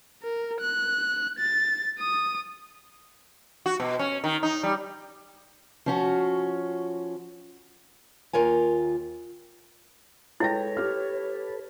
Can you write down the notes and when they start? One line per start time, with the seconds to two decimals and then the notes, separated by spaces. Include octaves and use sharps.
0.23 A#4
0.61 F#6
1.39 A6
1.99 D#6
3.66 F#4
3.80 B2
3.99 C#4
4.24 D#3
4.43 D#4
4.63 G3
5.86 F3 C#4 F#4
8.33 D#2 F4 A#4 C#5 G#5
10.40 G#3 E4 A4 B4 C#5 G5 A#6
10.77 G4 F6